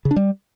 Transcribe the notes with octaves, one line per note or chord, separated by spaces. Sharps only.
C#3
D4
G3